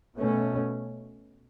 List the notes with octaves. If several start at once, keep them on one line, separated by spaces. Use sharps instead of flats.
B2 A3 C#4